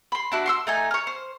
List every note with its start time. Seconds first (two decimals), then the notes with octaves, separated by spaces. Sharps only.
0.12 B5 C6
0.32 D4 E4 F#4
0.46 C6 C#6 E6
0.67 A3 D#4 G#5
0.91 C#5 F6
1.07 C5